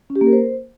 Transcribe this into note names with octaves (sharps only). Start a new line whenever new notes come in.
C#4
G4
A#3
A#4
C5